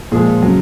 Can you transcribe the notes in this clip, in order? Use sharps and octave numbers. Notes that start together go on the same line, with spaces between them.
A#2 F3 G#3 G#4
C#3 F#3